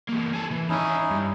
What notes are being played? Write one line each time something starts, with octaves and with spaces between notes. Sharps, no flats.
E3 A#3
G#4 A4
E3
D#3 C#4 D#4 E4 G#4
G2